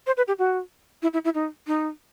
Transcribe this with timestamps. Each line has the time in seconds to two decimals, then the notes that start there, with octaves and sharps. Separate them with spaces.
0.07 C5
0.17 B4
0.28 G4
0.39 F#4
1.02 E4
1.13 E4
1.24 E4
1.34 D#4
1.67 D#4